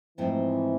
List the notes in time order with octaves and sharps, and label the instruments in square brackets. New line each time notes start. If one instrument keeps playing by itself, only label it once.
[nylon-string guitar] G#2 F3 A3 C4 [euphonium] E3